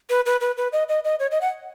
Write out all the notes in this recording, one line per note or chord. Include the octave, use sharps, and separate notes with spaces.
B4
B4
B4
B4
D#5
D#5
D#5
C#5
D#5
F#5